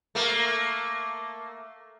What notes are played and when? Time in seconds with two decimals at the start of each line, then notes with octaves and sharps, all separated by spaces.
0.15 A3 A#3